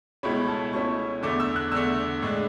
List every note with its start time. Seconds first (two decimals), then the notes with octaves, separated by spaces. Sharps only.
0.23 C#2 B2 A3 C#4 E4 B5
0.48 A5
0.72 C#2 B2 A3 C#4 E4 C#6
1.23 E2 D3 A3 D6
1.40 E6
1.56 F#6
1.72 E2 D3 A3 E6
2.22 A2 G#3 D4